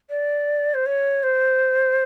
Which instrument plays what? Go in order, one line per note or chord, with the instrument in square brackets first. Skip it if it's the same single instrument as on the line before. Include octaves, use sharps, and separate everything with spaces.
[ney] D5
C5
C#5
C5